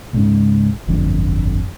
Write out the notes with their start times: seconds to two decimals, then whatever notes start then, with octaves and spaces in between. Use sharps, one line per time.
0.13 C#2 G#2 C#3
0.87 D1 G1 F2 D3